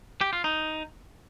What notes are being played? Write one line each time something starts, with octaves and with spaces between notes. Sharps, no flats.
G4
F4
D#4